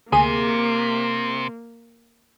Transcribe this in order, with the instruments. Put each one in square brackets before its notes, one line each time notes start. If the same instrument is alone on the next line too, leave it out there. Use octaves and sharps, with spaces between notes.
[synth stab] D2 G#4 D#7 [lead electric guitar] C3 [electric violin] A#3